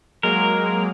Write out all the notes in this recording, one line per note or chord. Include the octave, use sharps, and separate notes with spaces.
F#3 G#3 A#3 A#4